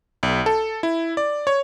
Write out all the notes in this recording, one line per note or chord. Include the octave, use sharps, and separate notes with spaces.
B1
A4
E4
D5
C#5